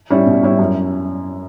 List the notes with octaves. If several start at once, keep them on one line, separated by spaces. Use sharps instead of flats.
G3 C#4 E4
B2
G3 C#4 E4
F#2